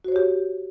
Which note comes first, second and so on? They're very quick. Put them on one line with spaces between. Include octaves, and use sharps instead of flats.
F#4 C5 C#5 G4